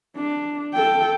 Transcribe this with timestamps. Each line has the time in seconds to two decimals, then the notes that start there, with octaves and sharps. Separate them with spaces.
0.17 D4
0.75 A4 G5